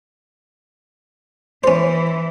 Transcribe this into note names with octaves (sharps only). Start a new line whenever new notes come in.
E3 C#4 C5